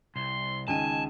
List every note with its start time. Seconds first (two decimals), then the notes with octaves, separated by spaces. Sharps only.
0.16 C2 C6
0.68 C#2 D#3 G#5 A5 D#7